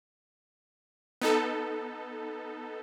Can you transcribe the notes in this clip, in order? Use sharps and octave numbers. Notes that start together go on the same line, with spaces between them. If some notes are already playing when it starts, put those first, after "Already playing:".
B3 D#4 A4